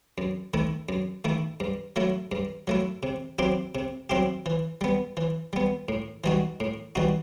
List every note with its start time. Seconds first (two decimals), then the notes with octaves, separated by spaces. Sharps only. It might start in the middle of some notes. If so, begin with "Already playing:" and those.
0.18 F#2
0.54 D#3 A3 E4
0.89 F#2
1.25 D#3 A3 E4
1.60 G2
1.96 F#3 A3 E4
2.32 G2
2.67 F#3 A3 E4
3.03 C3
3.39 F#3 C4 E4 G4
3.75 C3
4.10 F#3 C4 E4 G4
4.46 E3
4.81 G3 B3
5.17 E3
5.53 G3 B3
5.88 A2
6.24 E3 G3 D#4 F#4
6.60 A2
6.95 E3 G3 D#4 F#4